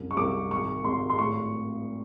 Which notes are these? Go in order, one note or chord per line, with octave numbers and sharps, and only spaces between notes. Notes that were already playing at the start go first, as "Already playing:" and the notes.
Already playing: C2 F#2
C#6
C2 D6
G#1 C#6
G#1 C6
C6
A2 C#6